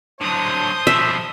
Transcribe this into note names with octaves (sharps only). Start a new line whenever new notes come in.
D3 F#3 C5 A5 D#6
B2 F3 E5